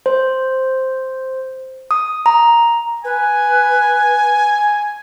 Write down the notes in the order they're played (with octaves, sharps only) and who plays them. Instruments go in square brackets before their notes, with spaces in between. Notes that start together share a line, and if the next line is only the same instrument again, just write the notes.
[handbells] C5
D#6
A#5
[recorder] B4 [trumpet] G#5